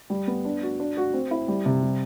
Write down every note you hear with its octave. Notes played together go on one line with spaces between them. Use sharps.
G3
B3
D4
F#4
D4
F#4
C4
E4
G3
C3
G3